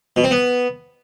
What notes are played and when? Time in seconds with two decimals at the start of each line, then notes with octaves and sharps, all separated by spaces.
0.16 B2
0.24 C4
0.31 B3